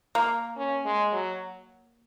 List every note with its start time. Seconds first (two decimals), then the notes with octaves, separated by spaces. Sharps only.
0.15 A#3
0.57 C#4
0.85 G#3
1.13 F#3